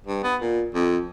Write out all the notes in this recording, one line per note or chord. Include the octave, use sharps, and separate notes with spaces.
G2
B3
A#2
F2